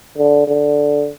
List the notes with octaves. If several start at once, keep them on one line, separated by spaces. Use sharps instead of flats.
D3
D3